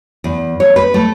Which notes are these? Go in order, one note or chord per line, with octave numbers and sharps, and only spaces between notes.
E2
C#5
B4
A3